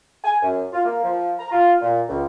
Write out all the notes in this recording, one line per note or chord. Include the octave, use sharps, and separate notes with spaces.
G#5
F#2
F4
A#3
F3
A#5
F4
A#2
C#2